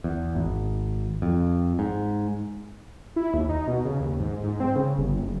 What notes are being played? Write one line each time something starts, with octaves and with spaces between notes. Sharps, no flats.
E2
G#1
F2
G#2
E4
D#2
D#4
B2
C#3
D#2
G#2
G#2
C4
C#3
G1
F#1